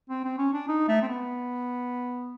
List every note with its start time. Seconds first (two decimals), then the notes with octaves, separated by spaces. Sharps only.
0.10 C4
0.25 C4
0.38 C#4
0.53 D4
0.68 D#4
0.88 A3
1.02 C4
1.08 B3